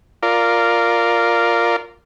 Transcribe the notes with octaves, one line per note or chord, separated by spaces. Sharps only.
F4 A#4 D5